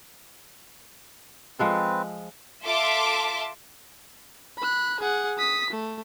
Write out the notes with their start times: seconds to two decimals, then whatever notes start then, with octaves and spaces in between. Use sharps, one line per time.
1.59 F3 G#3 C4 A4 B4
2.64 F4 A4 E5 A5 C6 D6
4.58 B5 F#6
5.00 G#4 F#5
5.38 D#6 B6
5.70 A3